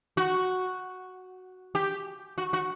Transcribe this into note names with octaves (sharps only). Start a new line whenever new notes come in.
F#4
G4
F#4
F#4